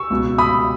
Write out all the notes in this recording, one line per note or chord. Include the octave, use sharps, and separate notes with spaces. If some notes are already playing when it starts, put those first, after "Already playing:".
Already playing: C#6 E6
C#2 B2
B5 D#6